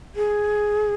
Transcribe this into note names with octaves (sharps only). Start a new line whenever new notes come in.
G#4